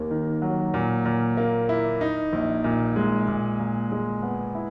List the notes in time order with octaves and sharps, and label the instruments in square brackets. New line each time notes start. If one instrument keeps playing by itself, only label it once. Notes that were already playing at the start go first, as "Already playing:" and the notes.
Already playing: [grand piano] D#2 A#3
D#3
F#3
A#2
A#2
A#3
E4
D#4
A#1
A#2
G#3
A#2
A#2
G#3
B3
E4